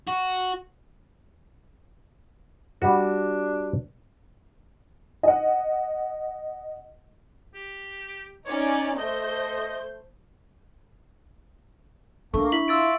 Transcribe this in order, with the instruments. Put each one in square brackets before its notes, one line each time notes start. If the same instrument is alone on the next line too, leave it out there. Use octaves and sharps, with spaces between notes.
[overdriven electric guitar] F#4
[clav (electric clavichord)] G3 F#4 [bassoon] D4
[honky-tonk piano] D#5 F#5
[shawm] G4
[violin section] C#4 D#4 D5 [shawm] C#5
[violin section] A3 C5 G6 [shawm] D#5
[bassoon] A3 [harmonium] A#3 [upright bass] D4 [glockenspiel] C#6
[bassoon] E4 [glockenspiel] B6 F#7
[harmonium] F4 E5 [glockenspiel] E6 A6 D7